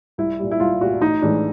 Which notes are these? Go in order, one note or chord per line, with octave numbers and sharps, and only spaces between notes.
C2 E4
A#2 G3
E4
C2 F4
A#2 G3 F#4
A1 D#4
A2 E3 G#3 D4